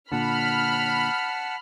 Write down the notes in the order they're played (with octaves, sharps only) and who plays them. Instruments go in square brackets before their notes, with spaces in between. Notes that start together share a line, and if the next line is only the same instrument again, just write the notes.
[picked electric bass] A#2 D3 [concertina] F#5 A5 [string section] B5 F6